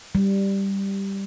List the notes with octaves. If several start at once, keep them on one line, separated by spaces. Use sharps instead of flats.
G3